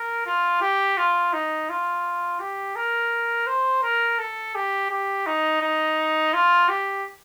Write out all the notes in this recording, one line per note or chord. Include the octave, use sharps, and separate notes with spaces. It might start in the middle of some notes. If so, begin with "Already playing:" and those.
Already playing: A#4
F4
G4
F4
D#4
F4
G4
A#4
C5
A#4
A4
G4
G4
D#4
D#4
F4
G4